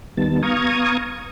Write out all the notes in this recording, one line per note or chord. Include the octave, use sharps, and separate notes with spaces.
D#2 D#3 G3 B3 A5
B3 F5 A#5 C#6 D#6 G#6